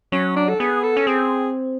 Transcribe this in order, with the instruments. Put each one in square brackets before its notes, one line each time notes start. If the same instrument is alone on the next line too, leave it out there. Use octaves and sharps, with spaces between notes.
[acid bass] F#3 [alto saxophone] C#4
[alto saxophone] D4
A4
[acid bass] B3 [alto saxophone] G#4
[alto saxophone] A4
[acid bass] C#4
[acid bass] C4 [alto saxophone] G#4